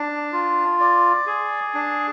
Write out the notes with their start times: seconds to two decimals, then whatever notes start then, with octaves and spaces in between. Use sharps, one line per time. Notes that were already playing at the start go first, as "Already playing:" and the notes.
Already playing: D4
0.32 F4
0.80 D5
1.26 G#4
1.74 D4